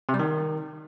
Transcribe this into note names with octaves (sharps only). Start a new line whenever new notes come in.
C3
G3
D#3